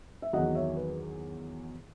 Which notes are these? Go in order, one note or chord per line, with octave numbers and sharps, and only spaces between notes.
E5
E2 D#3 F#3 D#5 F#5
C#5 E5
B4